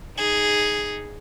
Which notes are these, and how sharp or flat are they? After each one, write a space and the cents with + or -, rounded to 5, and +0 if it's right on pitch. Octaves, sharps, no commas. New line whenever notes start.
D#4 +0 G#4 +0